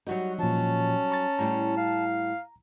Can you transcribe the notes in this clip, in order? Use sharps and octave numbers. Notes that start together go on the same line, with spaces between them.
F#3 G3 D#4 F#4
A#2 F3 C#4 A5
A#5 C#6 A6
A2 G3 A#5
F5